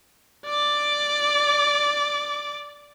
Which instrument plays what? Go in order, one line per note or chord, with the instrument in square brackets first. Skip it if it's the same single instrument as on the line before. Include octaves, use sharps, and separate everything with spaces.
[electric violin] D5 D6